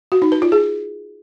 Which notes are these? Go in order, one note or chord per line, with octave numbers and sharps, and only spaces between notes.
F#4
D#4
B4
F4
G#4